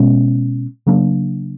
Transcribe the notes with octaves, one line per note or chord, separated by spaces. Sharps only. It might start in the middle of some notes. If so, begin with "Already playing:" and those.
Already playing: B2 G#3 C#4
C#3 F#3 A#3 D4